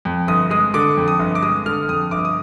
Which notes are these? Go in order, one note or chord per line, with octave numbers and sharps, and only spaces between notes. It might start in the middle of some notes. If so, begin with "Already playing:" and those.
F2
G1 D#6
G#3 D#6
D3 D6
F2
D#6
G1
D6
G#3 D#6
D3 F6
F2 D#6
G1 D6
D#6